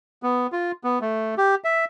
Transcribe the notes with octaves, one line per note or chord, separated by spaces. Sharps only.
B3
F4
B3
A3
G4
E5